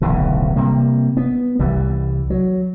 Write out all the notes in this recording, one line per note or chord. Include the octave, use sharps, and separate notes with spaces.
D1 B1 C#3 E3
C3 G3 A#3
B3
C2 E3 G3
F#3